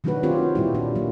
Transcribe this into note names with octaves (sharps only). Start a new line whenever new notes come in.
D#3 F#3 A3 D4 F#4 B4
C4 F4 G4 C#5
A#2 G3 E4
D4
F#3 A#3